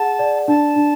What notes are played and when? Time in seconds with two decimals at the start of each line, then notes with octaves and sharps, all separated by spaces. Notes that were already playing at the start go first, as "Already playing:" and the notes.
Already playing: G#4 F#5 A5
0.19 D5
0.48 D4 A5
0.76 D4